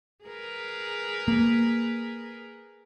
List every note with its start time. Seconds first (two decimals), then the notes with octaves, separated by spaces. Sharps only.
0.25 G#4 A#4 B4
1.28 A#3